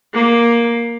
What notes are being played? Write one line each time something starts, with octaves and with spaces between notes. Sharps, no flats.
A#3